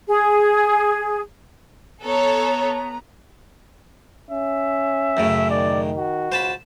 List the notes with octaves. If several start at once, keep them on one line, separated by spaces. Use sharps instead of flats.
G#4
B3 A4 C#5 A#5
C#4 E5
F#2 A2 C#3
D#3 D5
F#4
C#2 C5 A5 B5